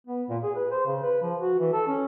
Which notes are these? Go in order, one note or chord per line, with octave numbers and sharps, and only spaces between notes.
B3
A#2
G#4
B4
C5
C#3
B4
F3
F#4
E3
A4
C#4